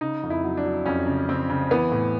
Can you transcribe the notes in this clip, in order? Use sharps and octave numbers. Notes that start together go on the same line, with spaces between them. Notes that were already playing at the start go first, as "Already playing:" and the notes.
C#3 D#4
F2
E4
F#3
D4
F#3
F2 C#4
C#3
C#3 C4
C#3
E3 B3
A2